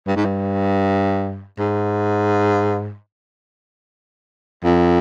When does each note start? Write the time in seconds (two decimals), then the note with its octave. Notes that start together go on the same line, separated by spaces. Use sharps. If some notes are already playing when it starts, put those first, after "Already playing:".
0.07 G2
0.16 G#2
0.25 G2
1.59 G#2
4.65 F2